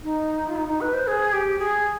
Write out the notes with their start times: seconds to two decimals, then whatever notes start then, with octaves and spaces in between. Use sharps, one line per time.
0.03 D#4
0.47 F4
0.56 D#4
0.68 D#4
0.81 B4
0.93 C5
1.07 G#4
1.33 G4
1.59 G#4